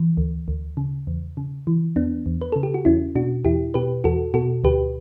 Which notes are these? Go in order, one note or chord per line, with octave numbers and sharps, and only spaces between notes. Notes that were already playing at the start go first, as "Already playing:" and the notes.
Already playing: E3
D2
D2
C#3
E2
C#3
E3
E2 B3 D4
E2
B4
C#3 A4
G4
F#4
E2 C#4 E4
B2 D4 F#4
E2 E4 G4
B2 G4 B4
E2 F#4 A4
B2 F#4 A4
D2 G4 B4